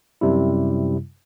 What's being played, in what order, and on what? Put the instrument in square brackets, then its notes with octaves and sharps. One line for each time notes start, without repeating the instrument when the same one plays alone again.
[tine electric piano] F#2 C3 G3 E4